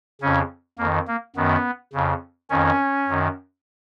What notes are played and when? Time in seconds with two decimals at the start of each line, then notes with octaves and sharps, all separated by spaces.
0.22 F2 C#3 C#4
0.78 F2 D#3 A#3
1.08 A#3
1.36 F#2 D#3 B3
1.93 F2 C#3
2.50 F2 D#3 C#4
3.08 F#2 D#3